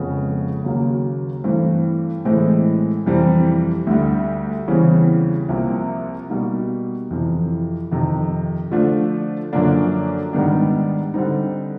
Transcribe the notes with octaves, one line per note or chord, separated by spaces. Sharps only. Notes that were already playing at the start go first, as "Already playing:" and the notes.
Already playing: F2 C#3 F3 G#3 B3
D#2 C#3 F#3 A#3
G2 E3 A3 C4
A2 E3 G#3 C4
F2 C3 E3 G3 C4
D2 D3 G3
E2 C#3 E3 G3 C4
C2 C3 F3 A#3
B2 G3 A#3 D#4
F2 C3 E3
F2 C3 D#3
D3 F3 A3 D4 F4
F#2 D3 F3 A#3 D4
G#2 D#3 G3 B3 D4
D3 G3 C4 D#4